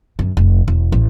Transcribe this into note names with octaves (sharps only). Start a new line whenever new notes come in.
F#2
F1
E1
A1